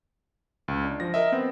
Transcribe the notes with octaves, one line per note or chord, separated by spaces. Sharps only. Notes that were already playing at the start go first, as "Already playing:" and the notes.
C#2
D4
F3 A#6
A#4 D#5 E5
B3 C4